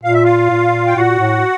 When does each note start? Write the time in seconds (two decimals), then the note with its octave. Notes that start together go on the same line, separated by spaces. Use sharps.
0.04 A#2 F5
0.14 E5
0.24 F4 F5
0.50 A#2
0.87 G5
0.96 A#2 F#4 F#5
1.19 A2